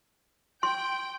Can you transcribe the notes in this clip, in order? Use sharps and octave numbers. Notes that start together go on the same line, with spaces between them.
G5 C6